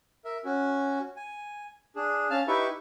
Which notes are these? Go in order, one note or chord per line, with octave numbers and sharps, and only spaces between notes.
A#4 E5
C#4 F#4
G#5
D4 G#4
C#4 F5 A5 F6
D#4 E4 G4 B4 E5 C#6